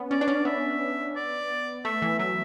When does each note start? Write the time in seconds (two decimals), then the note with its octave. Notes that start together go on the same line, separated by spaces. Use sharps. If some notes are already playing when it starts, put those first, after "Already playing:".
Already playing: B3 C#4
0.11 C#4 D5
0.21 D4
0.28 C#4
0.45 B3 E5
1.16 D5
1.85 A3 E5
2.02 E3
2.19 F#3 E5